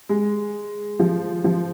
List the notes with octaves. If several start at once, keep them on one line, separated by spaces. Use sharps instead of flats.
G#3
F3
F3